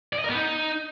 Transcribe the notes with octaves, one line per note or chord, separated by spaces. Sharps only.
D5
D#5
A#4
B3
D#4